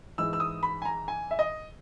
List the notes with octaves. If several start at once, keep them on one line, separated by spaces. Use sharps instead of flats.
G#2 E3 G#3 E6
E6
D#6
B5
G#5
A#5
G#5
E5
D#5